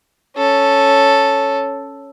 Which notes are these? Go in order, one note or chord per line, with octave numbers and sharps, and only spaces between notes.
C#4 A4